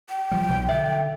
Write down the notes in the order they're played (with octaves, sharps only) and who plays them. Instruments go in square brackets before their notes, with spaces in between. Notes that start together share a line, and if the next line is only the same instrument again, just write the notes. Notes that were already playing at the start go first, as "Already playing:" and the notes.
[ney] G5
[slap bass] F3 G3
B1
[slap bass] D3 [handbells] E5